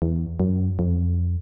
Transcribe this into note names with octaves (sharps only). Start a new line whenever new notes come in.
E2
F#2
F2